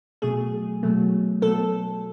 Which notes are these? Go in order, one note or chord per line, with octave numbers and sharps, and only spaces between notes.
B2 F#3 A3 G#4
B2 F#3 A3
B2 F#3 A3 A4